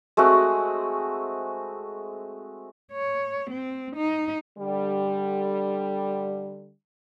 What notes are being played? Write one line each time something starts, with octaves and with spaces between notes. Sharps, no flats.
G#3 A3 C4 F#4
C#5
C4
D#4
D3 G3